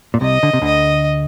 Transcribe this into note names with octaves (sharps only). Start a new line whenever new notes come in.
A#2
C2 C3 D#5
D3
C3
D2 D3 D#5